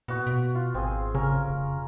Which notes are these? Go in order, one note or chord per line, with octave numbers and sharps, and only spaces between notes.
A#2 B3 F#4
B2
F4
G#1 C4 G#4
C#3 C#4 A#4
F1